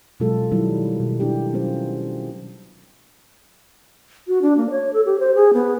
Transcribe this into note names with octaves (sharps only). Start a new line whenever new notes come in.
B2 F#3 G#3 F4 A4
D#3 F#3 G3 E4
B2
D4 E4 G4
F#3 B3 C#4 F4 C5
F#4
D4
A#3
C#5
A4
G4
C5
G#4
B3